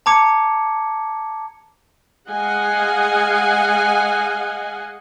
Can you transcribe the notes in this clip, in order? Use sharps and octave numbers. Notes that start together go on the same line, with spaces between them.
A5 A#5 D6 G#6 C#7
G#3 D#5 F5 F#5 G#5